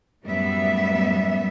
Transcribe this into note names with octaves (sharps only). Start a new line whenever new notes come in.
F#2 A2 F#3 G3 B3 E5